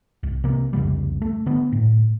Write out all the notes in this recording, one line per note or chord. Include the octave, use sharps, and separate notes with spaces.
C2
C3 A#3
C2 F2 C#3 G3
A3
D3 B3
A2